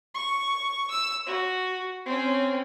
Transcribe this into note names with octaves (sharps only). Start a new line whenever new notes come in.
C#6
E6
F#4
C4 C#4